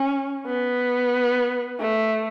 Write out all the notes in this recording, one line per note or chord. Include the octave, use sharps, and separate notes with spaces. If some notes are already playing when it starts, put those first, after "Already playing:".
Already playing: C#4
B3
A3